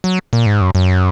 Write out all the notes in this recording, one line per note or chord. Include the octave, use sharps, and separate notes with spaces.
F#3
A#2
G#2
F#2
F#2